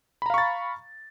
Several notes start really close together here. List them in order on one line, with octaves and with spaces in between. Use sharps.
B5 A#5 F5 C#6 A6